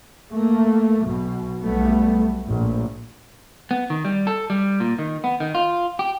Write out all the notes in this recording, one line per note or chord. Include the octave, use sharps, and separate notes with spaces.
A3 A#3
B1 B2
B1 G3 A3 B3
A#1 A2
B3
D#3
G3
A4
G3
A#2
D#3
B3
D#3
F4
G4